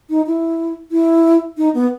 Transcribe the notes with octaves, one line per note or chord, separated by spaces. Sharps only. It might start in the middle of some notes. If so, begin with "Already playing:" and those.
D#4
E4
E4
D#4
B3